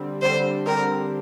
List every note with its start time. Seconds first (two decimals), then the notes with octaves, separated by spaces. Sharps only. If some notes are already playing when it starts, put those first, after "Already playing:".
Already playing: D3 G3 C4
0.22 D3 G3 C4 C5
0.66 D3 G3 C4 A#4